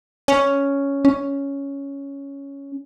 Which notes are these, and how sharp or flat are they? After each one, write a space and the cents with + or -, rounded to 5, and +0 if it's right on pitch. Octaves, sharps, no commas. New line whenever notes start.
C#4 +5
C#4 +5